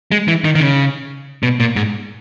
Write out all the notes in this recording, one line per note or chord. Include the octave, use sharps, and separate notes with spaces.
G#3
E3
D#3
D#3
C#3
B2
A#2
G#2